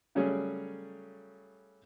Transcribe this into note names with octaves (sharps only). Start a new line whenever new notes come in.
C#3 F#3 G3 A3 C#4 G#4